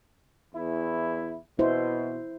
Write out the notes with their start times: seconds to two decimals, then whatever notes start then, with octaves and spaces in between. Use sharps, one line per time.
0.55 E2 E4
1.59 B2 E4 C5